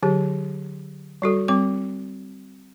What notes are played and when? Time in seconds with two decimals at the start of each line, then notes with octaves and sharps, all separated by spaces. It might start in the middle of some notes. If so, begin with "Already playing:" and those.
0.03 D3 F#3 G4
1.22 G3 F#4 A4
1.48 G3 C4 D6